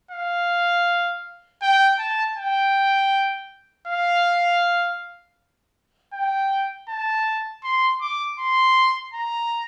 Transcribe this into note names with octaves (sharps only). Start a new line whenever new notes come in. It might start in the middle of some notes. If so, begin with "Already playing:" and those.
F5
G5
A5
G5
F5
G5
A5
C6
D6
C6
A#5